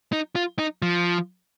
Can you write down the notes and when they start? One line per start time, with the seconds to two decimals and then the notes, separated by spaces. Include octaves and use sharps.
0.13 D#4
0.36 F4
0.59 D#4
0.82 F3